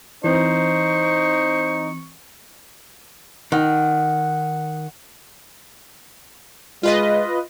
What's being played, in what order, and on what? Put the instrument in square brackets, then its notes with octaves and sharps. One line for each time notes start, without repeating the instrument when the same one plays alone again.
[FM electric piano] E3 C4 [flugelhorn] D#4 [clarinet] C5 [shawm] C#6
[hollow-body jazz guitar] D#3 [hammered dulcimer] F#5
[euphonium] G#3 [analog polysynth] F4 B4 D#5